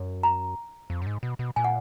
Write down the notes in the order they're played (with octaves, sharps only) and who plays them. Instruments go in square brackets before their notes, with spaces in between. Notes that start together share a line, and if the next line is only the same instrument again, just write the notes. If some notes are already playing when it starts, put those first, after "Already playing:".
Already playing: [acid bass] F#2
[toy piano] A#5
[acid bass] F2
F#2
G#2
B2
B2
[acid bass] A#2 [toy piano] G#5
[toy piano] F#5